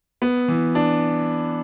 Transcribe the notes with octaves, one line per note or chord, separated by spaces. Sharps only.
B3
E3
D4